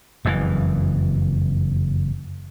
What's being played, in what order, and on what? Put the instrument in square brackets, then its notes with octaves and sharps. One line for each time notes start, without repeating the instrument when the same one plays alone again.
[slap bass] F#1 F2 G#2 E3